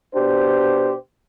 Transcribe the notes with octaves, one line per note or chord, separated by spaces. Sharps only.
B2 D4 G4 C5